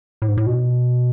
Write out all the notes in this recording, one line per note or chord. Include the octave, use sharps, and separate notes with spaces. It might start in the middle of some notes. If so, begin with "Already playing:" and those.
A2
G#2
A2
B2